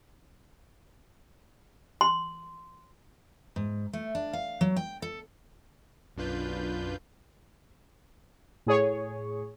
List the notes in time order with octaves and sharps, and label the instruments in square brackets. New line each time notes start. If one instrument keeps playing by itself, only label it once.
[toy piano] C6
[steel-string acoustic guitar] G#2
A3
D4
F5
F#3
G5
A4
[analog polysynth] B1 F#2 D4 F4 B4 G6
[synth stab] A2 G#4 C#5